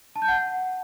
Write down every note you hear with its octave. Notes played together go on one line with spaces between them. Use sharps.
A5
G6
F#5